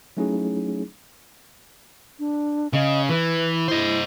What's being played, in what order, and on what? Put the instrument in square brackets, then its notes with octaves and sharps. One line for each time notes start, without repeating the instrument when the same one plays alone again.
[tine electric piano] F#3 A3 C#4 D#4 E4 G#4
[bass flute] D4
[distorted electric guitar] C#3 [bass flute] D#5
[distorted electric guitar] E3 [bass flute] B4
[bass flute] E4 [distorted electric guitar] C5 D#5